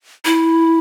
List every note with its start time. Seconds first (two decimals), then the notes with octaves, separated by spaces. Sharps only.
0.25 E4